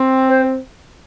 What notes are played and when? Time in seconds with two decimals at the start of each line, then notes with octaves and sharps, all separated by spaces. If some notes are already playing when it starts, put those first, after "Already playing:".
Already playing: C4
0.29 C5